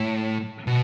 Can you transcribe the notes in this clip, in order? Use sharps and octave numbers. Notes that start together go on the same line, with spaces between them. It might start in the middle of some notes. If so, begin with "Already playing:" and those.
Already playing: A2
B2